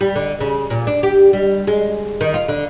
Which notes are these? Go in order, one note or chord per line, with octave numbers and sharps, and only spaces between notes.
G3
D3
C#3
A#2
D4
G4
G3
G#3
D#3
F4
D3